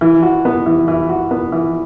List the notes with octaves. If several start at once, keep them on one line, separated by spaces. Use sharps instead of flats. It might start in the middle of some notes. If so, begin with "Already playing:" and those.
E3
F#4
B3
E3
E3
F#4
B3
E3